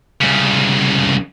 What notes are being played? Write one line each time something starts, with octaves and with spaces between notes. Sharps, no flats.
C2 C#3